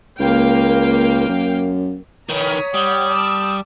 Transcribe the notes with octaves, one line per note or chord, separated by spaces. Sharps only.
C#2 A#3 F5 G5
F#2
D#3 E3 C#5 A#5 D#6 B6
G3 F#5 G5 D#6
A5 D6 E6